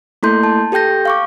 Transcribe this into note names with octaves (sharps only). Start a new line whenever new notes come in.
A3 A#3 E4 A4 C6 G6
A5
G4 A4 G5 G6 A#6
F5 C#6 D6